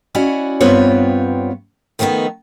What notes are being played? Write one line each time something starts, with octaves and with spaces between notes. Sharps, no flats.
C#4 E4 F#4 D5 D#5
G2 B3 C4 F4 B4 C#5
D#3 F3 A3 B3 D#4